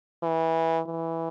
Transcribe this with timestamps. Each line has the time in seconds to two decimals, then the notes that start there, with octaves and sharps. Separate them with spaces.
0.23 E3
0.87 E3